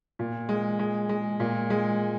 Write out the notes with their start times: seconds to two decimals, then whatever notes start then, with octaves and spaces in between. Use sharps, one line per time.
0.19 A#2
0.49 G#3
0.79 G#3
1.09 G#3
1.40 A#2
1.70 G#3